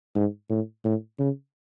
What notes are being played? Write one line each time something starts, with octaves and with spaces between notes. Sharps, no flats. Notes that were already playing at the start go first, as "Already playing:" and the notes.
G#2
A2
A2
C#3